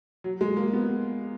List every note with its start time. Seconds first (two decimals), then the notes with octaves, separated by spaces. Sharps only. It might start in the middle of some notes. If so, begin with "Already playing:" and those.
0.24 F#3
0.41 G#3
0.57 A#3
0.73 B3